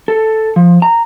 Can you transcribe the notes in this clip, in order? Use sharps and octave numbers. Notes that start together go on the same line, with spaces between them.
A4
F3
A#5